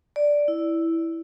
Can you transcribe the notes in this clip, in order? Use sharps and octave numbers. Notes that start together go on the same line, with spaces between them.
D5
E4